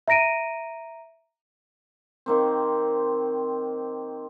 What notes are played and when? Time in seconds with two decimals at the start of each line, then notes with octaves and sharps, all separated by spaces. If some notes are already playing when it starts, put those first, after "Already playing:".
0.08 E5 A#5 A#6 D7 D#7
2.26 D#3 A#3 C4